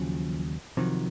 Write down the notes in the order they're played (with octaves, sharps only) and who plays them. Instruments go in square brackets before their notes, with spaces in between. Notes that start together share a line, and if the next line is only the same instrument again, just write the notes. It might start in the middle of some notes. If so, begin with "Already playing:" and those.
Already playing: [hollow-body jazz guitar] D#2 C#3 F#3 [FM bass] F3
[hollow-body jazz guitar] C3 D#3 F#3 [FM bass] F3